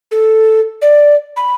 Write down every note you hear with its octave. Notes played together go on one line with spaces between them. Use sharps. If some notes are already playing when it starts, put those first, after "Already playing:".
A4
D5
B5